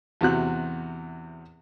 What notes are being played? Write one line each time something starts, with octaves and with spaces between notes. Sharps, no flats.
E2 C3 F#4 F#6